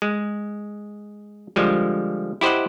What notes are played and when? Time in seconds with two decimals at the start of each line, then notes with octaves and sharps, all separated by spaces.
0.02 G#3
1.56 D3 F3 G3 G#3
2.41 E4 G4 C5 D#5 F#5